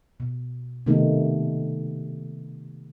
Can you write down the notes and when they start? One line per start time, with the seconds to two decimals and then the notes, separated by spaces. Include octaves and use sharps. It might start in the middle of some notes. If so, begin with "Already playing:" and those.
0.20 B2
0.86 C3 D#3 A3 B3 D#4 G4